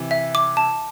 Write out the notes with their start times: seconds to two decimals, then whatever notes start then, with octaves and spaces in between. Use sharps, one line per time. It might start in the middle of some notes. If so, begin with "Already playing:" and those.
Already playing: C3 E3
0.11 E5
0.35 D6
0.57 A5